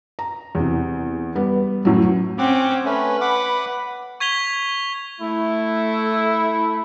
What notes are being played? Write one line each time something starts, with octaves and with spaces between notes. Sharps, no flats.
A#5
E2 C3
G3 B3
F#2 A2 F#3
C4 C#4 F#5 D6
A3 C#4 B4
F#5 B5 D6
C#6 G#6 B6 F7 G7
A3 E4